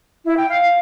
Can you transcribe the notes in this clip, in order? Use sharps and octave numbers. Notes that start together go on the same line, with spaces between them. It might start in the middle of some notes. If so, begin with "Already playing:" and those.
E4
G5
F5